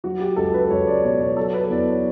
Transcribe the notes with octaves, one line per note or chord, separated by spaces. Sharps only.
F#3 F#4
G4
C#2 A4
B4
C#2 C#5
D5
B2 C#5
C#5
F#3 A4
B4
E2 D5
C#5